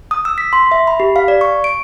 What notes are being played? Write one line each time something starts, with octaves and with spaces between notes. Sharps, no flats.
D#6
E6
B6
C6
E5
B5
G4
F5
D5
C#6
D7